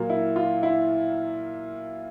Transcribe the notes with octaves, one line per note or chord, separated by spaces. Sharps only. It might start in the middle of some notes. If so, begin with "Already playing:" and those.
Already playing: A#2 F#3 A#3
E4
F4
E4